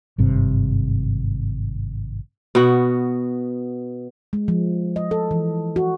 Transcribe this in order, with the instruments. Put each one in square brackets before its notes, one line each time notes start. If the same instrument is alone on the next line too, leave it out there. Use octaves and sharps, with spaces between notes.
[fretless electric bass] G#1 G2 C3
[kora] B2 B3 F#4
[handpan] G#3
F3
D#5
A4
E3
F#4